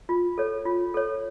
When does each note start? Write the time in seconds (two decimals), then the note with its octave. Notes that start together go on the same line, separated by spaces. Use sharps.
0.09 F4
0.38 A4 C#5
0.65 F4
0.94 A4 C#5